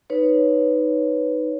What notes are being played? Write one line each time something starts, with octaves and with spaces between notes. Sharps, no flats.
D#4 B4 C#5